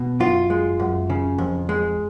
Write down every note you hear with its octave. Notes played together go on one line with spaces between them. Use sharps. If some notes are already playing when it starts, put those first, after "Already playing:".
Already playing: B2
F#2 F4
G#3
F#2
C#3
F2
G#3